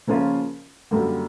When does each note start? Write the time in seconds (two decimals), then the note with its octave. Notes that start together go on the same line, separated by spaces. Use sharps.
0.07 C#3 F3 A#3 C#4 F4
0.91 F#2 D3 G3 A#3